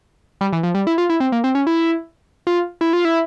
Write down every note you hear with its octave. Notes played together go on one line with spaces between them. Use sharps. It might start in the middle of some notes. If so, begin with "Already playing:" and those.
G3
E3
F3
G3
E4
F4
E4
C4
A#3
C4
C#4
E4
F4
E4
F4
E4